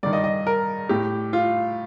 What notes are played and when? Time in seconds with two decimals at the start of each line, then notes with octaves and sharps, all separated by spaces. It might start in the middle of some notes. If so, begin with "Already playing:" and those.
0.03 G2 D#3 D5
0.13 D#5
0.24 D#5
0.47 A#4
0.89 A2 G4
1.33 F4